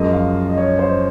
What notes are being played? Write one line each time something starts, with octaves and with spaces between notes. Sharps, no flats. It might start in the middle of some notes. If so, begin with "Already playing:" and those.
Already playing: F#2 F3 G#3 D#5
F5
D#5
C#5
C5